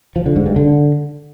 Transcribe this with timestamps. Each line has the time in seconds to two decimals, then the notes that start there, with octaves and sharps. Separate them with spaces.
0.16 F3
0.26 D3
0.36 G#2
0.46 G2
0.56 D3